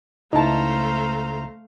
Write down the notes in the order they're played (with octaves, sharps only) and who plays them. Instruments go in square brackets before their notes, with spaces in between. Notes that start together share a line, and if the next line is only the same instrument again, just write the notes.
[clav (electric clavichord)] C#2 E4 [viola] A3 F5 [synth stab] D#4 A5 [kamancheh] C5 A#5